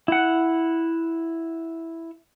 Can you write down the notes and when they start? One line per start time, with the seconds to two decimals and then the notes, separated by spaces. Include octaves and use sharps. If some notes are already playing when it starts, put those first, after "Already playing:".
0.08 E4 F#5